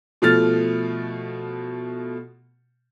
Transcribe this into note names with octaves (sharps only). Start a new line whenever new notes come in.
B2 F3 A3 F6 A6